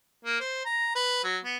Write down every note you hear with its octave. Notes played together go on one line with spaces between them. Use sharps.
A#3
C5
A#5
B4
F#3
B3